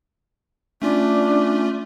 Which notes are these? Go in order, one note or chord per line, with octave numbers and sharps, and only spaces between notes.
A3 C#4 D4 F4